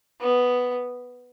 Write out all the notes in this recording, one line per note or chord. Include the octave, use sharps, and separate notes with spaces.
B3